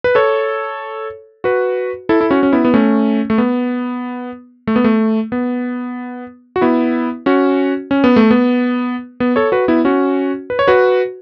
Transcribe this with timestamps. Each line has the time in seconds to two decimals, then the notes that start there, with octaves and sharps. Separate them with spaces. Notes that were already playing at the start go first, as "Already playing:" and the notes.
0.04 B4
0.15 A4 C#5
1.44 F#4 B4
2.09 E4 A4
2.21 E4
2.31 C#4 F#4
2.43 C#4
2.53 B3 E4
2.65 B3
2.74 A3 C#4
3.30 A3
3.38 B3
4.67 A3
4.76 B3
4.84 A3
5.32 B3
6.56 F#4
6.61 B3 E4
7.26 C#4 F#4
7.91 C#4
8.04 B3
8.16 A3
8.31 B3
9.20 B3
9.36 A4 C#5
9.52 F#4 B4
9.68 B3 E4
9.85 C#4 F#4
10.50 B4
10.59 C#5
10.68 F#4 B4